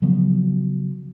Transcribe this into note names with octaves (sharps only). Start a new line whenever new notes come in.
C#3 F3 F#3 B3